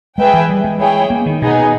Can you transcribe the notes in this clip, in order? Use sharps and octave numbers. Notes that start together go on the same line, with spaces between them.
G#3 G#4 B4 E5 G5
E3
G3
G#3
E4 G#4 C#5 G5
A#3
D#3
B2 B3 D#4 G#4